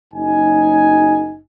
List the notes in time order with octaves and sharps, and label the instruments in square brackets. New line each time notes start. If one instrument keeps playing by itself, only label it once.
[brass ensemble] F#1 D#4 G#5